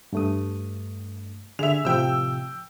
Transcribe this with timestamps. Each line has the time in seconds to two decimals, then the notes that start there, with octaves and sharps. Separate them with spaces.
0.13 G2 A3 D#6
1.59 D3 G#4 E5 F7
1.85 A2 C3 F3 G5 E6